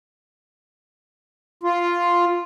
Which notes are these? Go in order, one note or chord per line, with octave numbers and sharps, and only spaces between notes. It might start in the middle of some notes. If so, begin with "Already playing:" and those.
F4